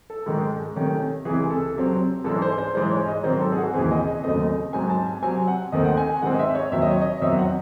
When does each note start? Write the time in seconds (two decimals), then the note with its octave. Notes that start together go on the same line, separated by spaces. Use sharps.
0.10 A4
0.26 G#2 D#3 G#3
0.76 C3 D#3 A3 C#4
1.25 E3 G#4
1.28 C#2 C3
1.50 A4
1.75 C3 F#3 C4
2.24 G#2 E3 G#3 C#4 A4
2.42 C5
2.58 C5
2.75 G#2 E3 G#3 C5
2.91 C#5
3.08 D#5
3.24 G#2 D#3 F#3 C4 C5
3.41 A4
3.52 G#4
3.57 F#4
3.74 D#2 C#3 E3 C4 G#4
3.91 D#5
4.07 D#5
4.23 D#2 C#3 F#3 A3 C4 D#5
4.73 G#2 F#3 C4 G#5
4.89 A5
5.06 G#5
5.22 C3 F#3 C4 G#5
5.48 F#5
5.72 D#2 D#3 A3 C4 D#5
5.85 F#5
5.97 G#5
6.09 G#5
6.22 G#2 D#3 G#3 C4 F#5
6.34 D#5
6.39 E5
6.55 C#5
6.72 D#2 D#3 F#3 C4 E5
6.82 D#5
6.91 C#5
7.01 D#5
7.17 D#5
7.21 E2 D#3 F#3 C4 E5
7.38 F#5